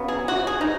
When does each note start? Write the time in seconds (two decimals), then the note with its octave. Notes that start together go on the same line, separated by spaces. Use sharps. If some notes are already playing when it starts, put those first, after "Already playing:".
Already playing: C#3 F#3 B3
0.08 G#4
0.28 F#4
0.47 G#4
0.61 D#4